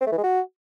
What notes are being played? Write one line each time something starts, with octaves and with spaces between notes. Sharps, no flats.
C4
A3
E3
G#3
F#4